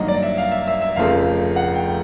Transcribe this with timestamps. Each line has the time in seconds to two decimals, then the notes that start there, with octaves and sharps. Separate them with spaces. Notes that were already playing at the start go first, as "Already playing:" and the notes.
Already playing: G2 D#3 F#3 A#3 D#5
0.08 D5
0.23 E5
0.38 F5
0.52 E5
0.68 E5
0.82 E5
0.96 F1 F2 C#3 F3 A3 F5
1.56 F#5
1.75 G5